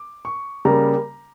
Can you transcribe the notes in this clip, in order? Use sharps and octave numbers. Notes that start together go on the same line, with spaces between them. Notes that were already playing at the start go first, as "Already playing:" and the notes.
Already playing: D6
C#6
C#3 G3 A#3 A#5